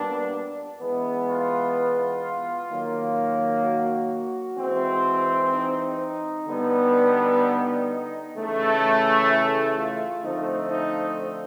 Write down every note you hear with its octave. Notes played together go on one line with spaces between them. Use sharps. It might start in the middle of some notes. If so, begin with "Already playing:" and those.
Already playing: A#2 G3 B3 D4
E3 G#3 B3
F4
D#3 F#3 A#3
F#4
E3 G#3 C4
D#4
D3 G3 B3
C#3 E3 A3
E4
F4
D3 F3 A3 C4 D#4
D#4